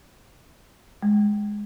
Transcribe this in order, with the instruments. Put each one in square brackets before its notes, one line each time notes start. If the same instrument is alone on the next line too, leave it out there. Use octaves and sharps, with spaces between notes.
[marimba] G#3